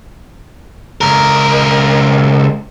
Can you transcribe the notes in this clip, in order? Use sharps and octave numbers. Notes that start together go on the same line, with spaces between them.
C#2 A#4